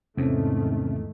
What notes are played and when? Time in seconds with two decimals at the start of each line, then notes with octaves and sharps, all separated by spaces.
0.17 E2 G#2 C3 D#3 A3 C4 C#4